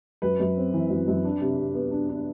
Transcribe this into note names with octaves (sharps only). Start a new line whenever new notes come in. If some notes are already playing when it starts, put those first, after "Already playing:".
F#2 B4
F#2
C4
E3
F#2
F#2
D4
C3
C3
B3
D4
D4